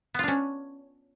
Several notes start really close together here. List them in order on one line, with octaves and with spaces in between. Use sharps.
B3 F4 D4 C#4